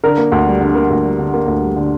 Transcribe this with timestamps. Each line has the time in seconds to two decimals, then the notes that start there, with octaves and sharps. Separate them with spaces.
0.03 D3 A#4
0.18 A#3
0.32 D2
0.47 G3
0.61 D3
0.75 A#3
0.90 D2
1.04 G3
1.19 D3
1.34 A#3
1.47 D2
1.62 G3
1.76 D3